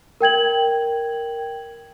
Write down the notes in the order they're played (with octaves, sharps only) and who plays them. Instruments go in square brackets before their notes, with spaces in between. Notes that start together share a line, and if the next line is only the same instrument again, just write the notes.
[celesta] A#4 G5 G#6 F#7